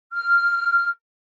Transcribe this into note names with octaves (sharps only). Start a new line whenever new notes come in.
F6